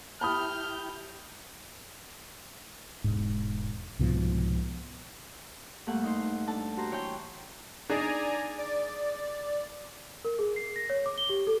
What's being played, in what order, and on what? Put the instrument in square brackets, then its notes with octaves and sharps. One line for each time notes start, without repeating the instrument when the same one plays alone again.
[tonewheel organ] E4 G4 G6 [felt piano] A5 B5 D#6 [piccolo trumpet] F6
[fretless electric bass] E1 G#2
C2 G#2 B2 F3
[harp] G2 A3 A#3 F#5
D#4 C5
D4 A4 A5
F#4 G4 C5 A#5
E3 C#5 G5 C6 G6
[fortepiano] D4 D#4 G#4 [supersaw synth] D5 G#5 A#5
[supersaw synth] D5
[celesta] A#4
G#4
C7
A#6
C#5
D6
G7
G4
A4